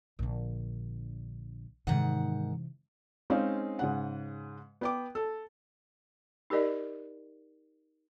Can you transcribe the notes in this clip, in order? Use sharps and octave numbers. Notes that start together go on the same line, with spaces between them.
A#1 D3
G#2 C3 D#3 E3 F#5
G#3 C4 C#4 D#4 F5
G#2 C#3 F#5
B3 G5 D6
A4
D#4 G4 A#4 D5 D#5